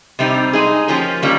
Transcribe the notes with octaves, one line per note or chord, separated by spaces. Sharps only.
C3 G3 C4 D#4
G#3 D#4 G#4
F3 A#3 C#4 G4
D#3 G3 A#3 C#4